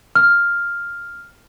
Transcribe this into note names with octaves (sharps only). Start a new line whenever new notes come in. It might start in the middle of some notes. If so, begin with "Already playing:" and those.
F6